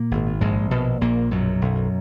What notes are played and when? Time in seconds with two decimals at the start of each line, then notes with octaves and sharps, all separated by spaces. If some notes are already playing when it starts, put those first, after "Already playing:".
Already playing: A#2 A#3
0.11 G#1
0.41 A#1 G#2 G#3
0.71 A#1 B2 B3
1.01 A#1 A#2 A#3
1.31 F#2 B2 F#3
1.61 B1